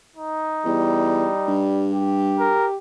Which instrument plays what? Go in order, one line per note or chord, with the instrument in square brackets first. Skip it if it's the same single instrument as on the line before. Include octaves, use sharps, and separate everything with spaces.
[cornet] D#4
[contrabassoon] E2 [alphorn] G3
[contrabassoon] G2
[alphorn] G4
[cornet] A#4